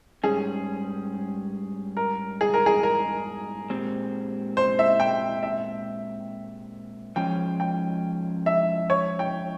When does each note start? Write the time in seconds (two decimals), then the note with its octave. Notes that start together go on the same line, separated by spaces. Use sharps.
0.23 G#2 G3 C#4 G#4
1.97 A#4
2.41 G#4
2.54 A#4
2.66 G#4
2.83 A#4
3.70 A#2 G#3 C4 G4
4.57 C5
4.79 E5
5.00 G5
5.43 E5
7.16 F3 G#3 C#4 G5
7.60 G5
8.46 E5
8.90 C#5
9.19 G5